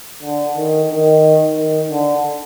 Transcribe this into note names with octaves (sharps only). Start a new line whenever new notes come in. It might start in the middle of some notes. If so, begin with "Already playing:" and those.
D3
D#3
D#3
D#3
D3